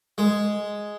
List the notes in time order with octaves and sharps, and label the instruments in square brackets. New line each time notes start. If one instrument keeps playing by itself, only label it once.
[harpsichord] G#3